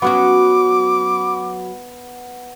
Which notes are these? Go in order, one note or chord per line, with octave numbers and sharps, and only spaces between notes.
F#3 B3 C#4 F#4 D6